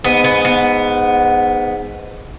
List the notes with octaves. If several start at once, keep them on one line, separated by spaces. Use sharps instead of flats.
G#2 B3
B3
B3